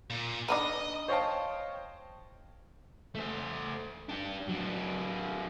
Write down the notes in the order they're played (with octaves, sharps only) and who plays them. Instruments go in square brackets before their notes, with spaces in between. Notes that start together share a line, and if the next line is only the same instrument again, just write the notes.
[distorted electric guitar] A#2
[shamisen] D4 D#4 B4 [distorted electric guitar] D#5
[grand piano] C5 C#5 D#5 F5 G5 A5
[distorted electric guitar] A3 C5
D4 G4
F#3 D4